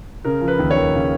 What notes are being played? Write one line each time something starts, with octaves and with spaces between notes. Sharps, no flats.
C#3 A#4
F3
B4
D#2
C#5
D#2
C#3